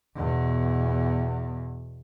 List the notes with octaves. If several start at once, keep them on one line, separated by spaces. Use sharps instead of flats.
E2 B2